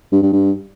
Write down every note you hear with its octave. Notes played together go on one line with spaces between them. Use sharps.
G2
G2
G2